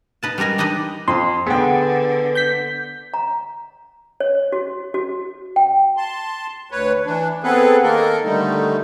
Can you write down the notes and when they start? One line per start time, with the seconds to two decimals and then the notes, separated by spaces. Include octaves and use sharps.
0.23 D#4 B4 A5
0.38 G3 G#3 D#4 A#4 G#5
0.58 D4 D#4 G4 B4 D#5
1.08 F2 C6
1.46 D3 B3 G#4 G5
2.35 G6 B6
3.14 A#5
4.20 C#5
4.52 F#4
4.94 F#4
5.56 G5
5.97 A5 C6
6.71 D2 B4 C#5
7.05 E3 D4
7.44 B3 C4 G#4 A4 B4
7.83 D#3 A#3 A4 A#4
8.24 D3 D#3 G3 A3 D#4